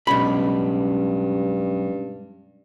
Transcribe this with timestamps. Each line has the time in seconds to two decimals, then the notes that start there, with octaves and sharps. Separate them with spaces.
0.07 B1 G2 G#3 C#4 G4 B5